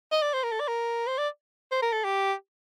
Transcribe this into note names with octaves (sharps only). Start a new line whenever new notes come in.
D#5
D5
C5
A#4
A4
D5
A#4
C5
D5
C5
A#4
A4
G4